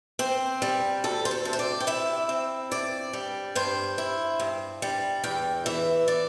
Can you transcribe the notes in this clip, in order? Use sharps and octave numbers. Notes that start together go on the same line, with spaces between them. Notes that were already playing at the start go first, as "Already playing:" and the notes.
C4 C5
G3
D2 A4
C5
A4
C3
C5
D5
G5
E4 E5
C4
G2 D5
G3
G2 C5
E4
G2
G3
E2 G5
E3 E5
D5